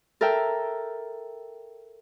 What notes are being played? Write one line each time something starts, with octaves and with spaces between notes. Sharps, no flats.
A4 A#4 E5 G5